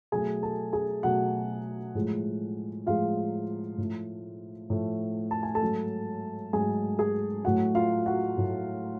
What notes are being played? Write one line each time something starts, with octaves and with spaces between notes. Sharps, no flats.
B2 F#3 A3 G#4 G#5
A4 A5
G#4 G#5
B2 F#3 A3 F#4 F#5
A2 F3 G#3
A2 F3 G#3 F4 F5
A2 F3 A3
A2 F3 A3
A5
G#5
A4 A5
G#2 F#3 A3
G#2 F#3 A3 G#4 G#5
G#4 G#5
A2 F#3 A3 F#4 F#5
F4 F5
F#4 F#5
A2 F#3 A3